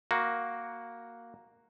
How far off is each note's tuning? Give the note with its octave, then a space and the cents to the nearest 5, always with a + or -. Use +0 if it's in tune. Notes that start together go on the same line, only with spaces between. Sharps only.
A#3 +0 F#4 +0